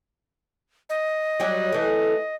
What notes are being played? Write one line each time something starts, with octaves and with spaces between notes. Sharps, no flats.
D#5
F#3 G3 G4
E3 A3